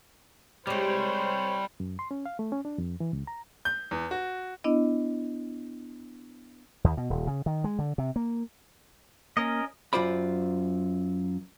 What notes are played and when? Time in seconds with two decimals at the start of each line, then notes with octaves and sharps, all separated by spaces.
0.67 G3 G#3 C4 G4 C5 C#5
1.80 F#2
1.99 C6
2.11 C#4
2.26 F5
2.39 A3
2.52 C#4
2.65 D4
2.78 F2
3.00 E3
3.13 C#2
3.27 A#5
3.65 G6
3.91 E2
4.11 F#4
4.64 B3 D4 E4 D#5
6.84 D#2
6.97 B2
7.10 D#1
7.27 C#3
7.46 D#3
7.64 G#3
7.79 D3
7.98 C3
8.16 A#3
9.37 A#3 C#4 A#4 D#5
9.93 F#2 F4 C5 D5 B5